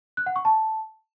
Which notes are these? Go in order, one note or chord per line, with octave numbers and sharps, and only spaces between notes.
F#6
F#5
C#6
A5